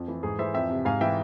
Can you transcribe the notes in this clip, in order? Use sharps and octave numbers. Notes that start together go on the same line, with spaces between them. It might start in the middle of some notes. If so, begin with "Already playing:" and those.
Already playing: F2
E3
G#2 G#4
E3 C5 E5
F2 E5 G5
C3
G#2 F5 G#5
E3 E5 G5